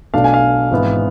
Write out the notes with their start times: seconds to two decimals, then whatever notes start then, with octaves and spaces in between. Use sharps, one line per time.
0.14 B1 B2 A3 D4 F5
0.24 G#5
0.34 F5
0.71 G#1 G#2 E3 B3